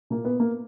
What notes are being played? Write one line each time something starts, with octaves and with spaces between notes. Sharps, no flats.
A#2 A#3
B3
A#3